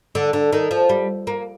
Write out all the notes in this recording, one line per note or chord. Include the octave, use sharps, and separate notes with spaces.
D3
D3
D#3
F3
G3
A#3